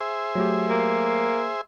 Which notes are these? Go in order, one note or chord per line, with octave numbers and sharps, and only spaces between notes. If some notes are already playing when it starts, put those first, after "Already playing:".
G#4 C5 E5
F#3 A3 G4
A#3